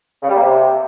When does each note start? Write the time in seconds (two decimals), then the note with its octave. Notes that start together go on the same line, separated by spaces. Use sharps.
0.23 C#3
0.29 G3
0.35 A#3
0.41 C3